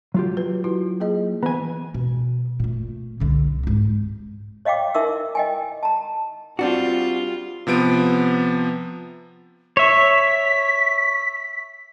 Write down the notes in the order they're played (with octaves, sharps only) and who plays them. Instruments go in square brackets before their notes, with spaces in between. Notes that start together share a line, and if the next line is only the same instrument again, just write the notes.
[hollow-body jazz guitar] F#3 F4 G4
[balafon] B4
E4 F#4
A#3 G#4 D#5
[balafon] E3 [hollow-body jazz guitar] B3 G#5
[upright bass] B2
A#2 A3
C2 D3
G#2 D#4
[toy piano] C#5 D#5 F5 G5 D6
D#4 E4 A#4 E5 D6 E6
D#5 G5 G#5
A5 A#5
[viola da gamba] G3 F4 [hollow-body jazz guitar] C4 D4 F#4
[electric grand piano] C3 F3 B3 D7
[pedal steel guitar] C#5 E5 [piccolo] B6